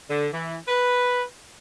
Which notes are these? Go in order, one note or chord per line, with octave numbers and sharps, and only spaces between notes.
D3
E3
B4